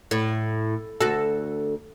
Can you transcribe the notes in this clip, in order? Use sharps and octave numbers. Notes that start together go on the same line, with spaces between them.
A2
D2 F#4 A4